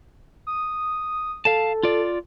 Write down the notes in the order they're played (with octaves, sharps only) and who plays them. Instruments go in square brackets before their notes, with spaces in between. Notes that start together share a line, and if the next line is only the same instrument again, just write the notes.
[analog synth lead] D#6
[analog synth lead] A4 [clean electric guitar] F5 A5
[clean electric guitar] F4 D5